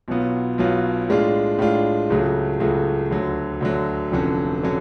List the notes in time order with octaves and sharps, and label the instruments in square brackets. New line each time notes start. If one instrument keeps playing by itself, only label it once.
[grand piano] B1 B2 F#3 B3 F4
B1 B2 F#3 B3 F4
A2 G#3 D4 F4
A2 G#3 D4 F4
C#2 C#3 F#3 A3
C#2 C#3 F#3 A3
D2 D3 F#3
D2 D3 F#3
F1 F2 D3 F#3 C#4
D3 F#3 C#4